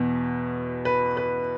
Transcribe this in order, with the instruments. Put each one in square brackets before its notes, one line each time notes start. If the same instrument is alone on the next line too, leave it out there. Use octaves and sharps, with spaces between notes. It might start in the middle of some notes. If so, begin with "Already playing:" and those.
Already playing: [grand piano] E2 B2
B4
B4